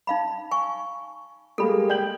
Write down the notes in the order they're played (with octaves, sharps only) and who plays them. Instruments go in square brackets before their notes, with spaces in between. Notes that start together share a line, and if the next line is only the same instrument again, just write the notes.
[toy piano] D#4 F5 B5
G#5 C#6
[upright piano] G3 G#3 A#3 [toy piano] A4 B5
[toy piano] D5 [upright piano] G5 G6 F#7